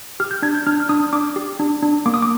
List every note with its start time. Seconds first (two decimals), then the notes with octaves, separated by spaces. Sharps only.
0.20 G4 F6
0.31 G6
0.42 D4 G#6
0.55 G6
0.67 D4 F6
0.80 F6
0.89 D4 D#6
1.13 D4 D6
1.36 G4
1.60 D4
1.83 D4
2.06 A#3 D6
2.14 D#6
2.22 D6